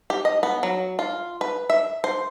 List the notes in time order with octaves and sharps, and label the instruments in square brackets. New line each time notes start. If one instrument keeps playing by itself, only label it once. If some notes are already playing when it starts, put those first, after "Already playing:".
[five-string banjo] G4
D#5
B3
F#3
F4
B4
E5
C5